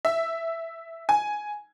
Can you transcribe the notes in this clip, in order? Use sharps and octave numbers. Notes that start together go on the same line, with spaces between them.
E5
G#5